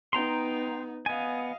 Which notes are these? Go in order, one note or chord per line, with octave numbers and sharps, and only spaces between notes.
B3 D#4 G5 A#5 C6
B3 D#5 F5 G#5